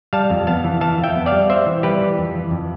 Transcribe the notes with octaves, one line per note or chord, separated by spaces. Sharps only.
G3 F5 A5
F2
B3 F5 A5
E3
E3 F5 A5
F2
E5 G5
B3
D5 F5
G3
C4 C5 E5
E3
G3 G4 B4
E3
F2
E3
F2